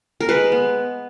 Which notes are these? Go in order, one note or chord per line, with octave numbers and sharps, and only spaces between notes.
A#4
G#3 B4
B3